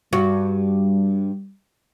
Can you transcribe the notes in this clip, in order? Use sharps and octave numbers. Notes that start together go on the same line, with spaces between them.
G2 G3 F#4